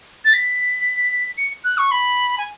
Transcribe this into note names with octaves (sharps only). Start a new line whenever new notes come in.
A6
B6
C#7
F#6
C#6
B5
G#5